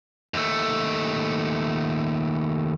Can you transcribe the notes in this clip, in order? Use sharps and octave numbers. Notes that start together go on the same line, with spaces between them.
D#2 A3